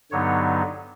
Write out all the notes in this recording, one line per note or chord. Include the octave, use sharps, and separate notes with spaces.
G2 D3 F#3 B3 D#4 C#5